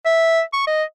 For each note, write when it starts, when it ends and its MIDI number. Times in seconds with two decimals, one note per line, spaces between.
0.06 0.42 76
0.53 0.63 85
0.67 0.83 75